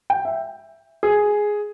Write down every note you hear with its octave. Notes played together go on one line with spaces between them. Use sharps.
G5
E5
G#4